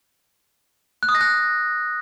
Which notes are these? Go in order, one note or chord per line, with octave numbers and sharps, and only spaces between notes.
F#6
D#6
A#6
F#6